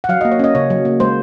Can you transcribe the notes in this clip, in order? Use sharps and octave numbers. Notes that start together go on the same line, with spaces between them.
F#5
F#3 F5
D#5
A#3
C#5
C#4 D#5
C#3 C#5
F#3
A#3
G#3 C5